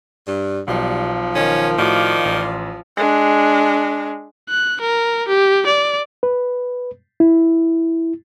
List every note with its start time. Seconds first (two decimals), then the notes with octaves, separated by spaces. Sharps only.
0.27 G2
0.68 B1 B2 F3 G3
1.35 D#3 C#4
1.78 A2 D#3 F#4 D5 F5 D6
2.25 A1
2.97 G#3 D4
4.49 F#6
4.81 A#4
5.28 G4
5.67 D5
6.23 B4
7.20 E4